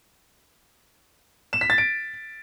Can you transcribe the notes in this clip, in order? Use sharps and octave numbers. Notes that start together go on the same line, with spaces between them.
E7
B6
A6
D7